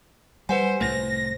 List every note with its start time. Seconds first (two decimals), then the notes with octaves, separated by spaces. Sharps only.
0.49 G3 B4 C5 F#5 G#5
0.81 C2 A2 A3 C5 A#6